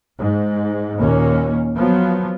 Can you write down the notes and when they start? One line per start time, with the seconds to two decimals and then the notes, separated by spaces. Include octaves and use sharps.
0.17 G#2
0.98 D#2 A#2 A#3 C#4
1.75 F3 F#3 B3